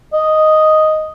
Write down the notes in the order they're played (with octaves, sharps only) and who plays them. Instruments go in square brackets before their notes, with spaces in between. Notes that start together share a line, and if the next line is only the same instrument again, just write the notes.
[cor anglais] D#5